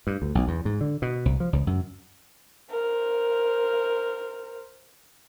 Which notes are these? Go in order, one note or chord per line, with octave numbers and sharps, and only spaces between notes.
G2
D2
B1
E2
G#2
D3
B2
C2
F3
C#2
F#2
A#4 C5